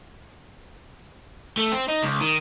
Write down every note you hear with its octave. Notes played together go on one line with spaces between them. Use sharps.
A3
C4
D#4
C#2
D#3